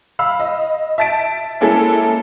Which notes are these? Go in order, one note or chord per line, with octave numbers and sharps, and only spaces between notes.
F5 B5 E6
D#5
E5 A5 A6 B6 D7
G#3 A#3 C#4 E4 G#4 A4